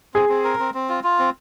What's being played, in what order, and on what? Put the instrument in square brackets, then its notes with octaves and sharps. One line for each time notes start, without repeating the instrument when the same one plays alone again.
[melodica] C4 [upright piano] G#4
[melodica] C4
A#4
C4
C4
F4
F4
C4